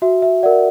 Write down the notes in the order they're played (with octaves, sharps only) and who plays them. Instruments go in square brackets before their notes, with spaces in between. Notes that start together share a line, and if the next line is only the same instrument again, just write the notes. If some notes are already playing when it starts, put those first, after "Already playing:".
[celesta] F#4 E5
E5
D5 F#5
A#4